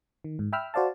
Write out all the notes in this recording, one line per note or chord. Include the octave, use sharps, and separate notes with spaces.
D#3
G#2
E5 G5 B5 E6 F6
F#4 C5 D5 F5 A5